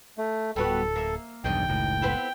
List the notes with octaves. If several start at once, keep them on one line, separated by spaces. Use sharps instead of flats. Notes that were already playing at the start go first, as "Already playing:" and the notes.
A3
D1 G3 B3 F#4 A4
A#3 E5
B1 E2 G2 D#3 D#5 G5
F#1 C#2 A2
B3 C4 E4